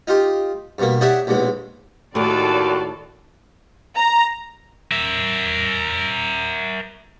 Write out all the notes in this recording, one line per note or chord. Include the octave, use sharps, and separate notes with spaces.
D#4 F4 G4
G2 B2 A#3
D#4 G4 C#5 D5 E5 F#5
A#1 D#2 B2 G#3
D#2 A2 D#3 F#4 A4 D5
A#5
A#4 E5